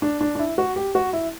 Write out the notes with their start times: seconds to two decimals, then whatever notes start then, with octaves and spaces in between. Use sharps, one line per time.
0.02 D4
0.21 D4
0.35 D4
0.39 E4
0.58 F#4
0.76 G4
0.95 F#4
1.13 E4